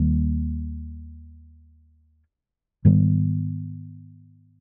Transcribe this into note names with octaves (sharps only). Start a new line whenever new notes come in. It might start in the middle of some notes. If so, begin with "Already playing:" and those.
Already playing: D#2 D#3 G3 A#3
G#2 D#3 G3 B3